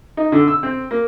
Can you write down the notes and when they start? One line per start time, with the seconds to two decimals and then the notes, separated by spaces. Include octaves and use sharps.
0.17 D#4
0.32 D3
0.48 E6
0.63 C4
0.91 A#3